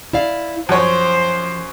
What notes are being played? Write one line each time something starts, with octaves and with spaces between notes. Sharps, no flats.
E4 D5 F5
F#2 F3 C5 C#5